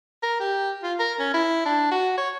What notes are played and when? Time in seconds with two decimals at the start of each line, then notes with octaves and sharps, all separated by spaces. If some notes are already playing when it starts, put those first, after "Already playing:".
0.23 A#4
0.39 G4
0.83 F4
0.99 A#4
1.19 C#4
1.34 E4
1.65 D4
1.91 F#4
2.17 C#5